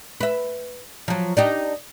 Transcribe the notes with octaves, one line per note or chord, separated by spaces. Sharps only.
B4 E5
F3 F#3
D4 D#4 G4